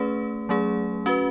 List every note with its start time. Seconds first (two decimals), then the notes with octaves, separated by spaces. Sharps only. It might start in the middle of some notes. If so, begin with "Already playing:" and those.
Already playing: A3 C#4 G#4 B4
0.49 F#3 A3 C#4 G#4
1.06 C#4 F#4 B4